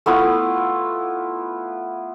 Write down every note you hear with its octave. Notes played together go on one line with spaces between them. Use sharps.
A3 B3 E4 F4